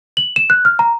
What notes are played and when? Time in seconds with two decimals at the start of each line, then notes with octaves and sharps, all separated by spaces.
0.17 F#7
0.36 E7
0.50 F#6
0.65 F6
0.79 A#5